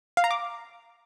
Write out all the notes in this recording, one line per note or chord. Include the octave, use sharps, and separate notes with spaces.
F5
A#5
D6